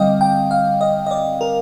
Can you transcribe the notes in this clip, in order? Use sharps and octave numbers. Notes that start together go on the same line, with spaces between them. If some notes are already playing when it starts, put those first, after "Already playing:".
Already playing: D3 G3 C4 D#5 F5 G5
G5
F5
D#5
D#5
D5
A#4